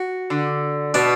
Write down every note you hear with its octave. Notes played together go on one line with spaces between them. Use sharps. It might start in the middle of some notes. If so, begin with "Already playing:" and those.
Already playing: F#4
D3
B2 D4